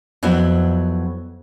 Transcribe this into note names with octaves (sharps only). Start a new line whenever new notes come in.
F2 F#3 B3 E4 C#5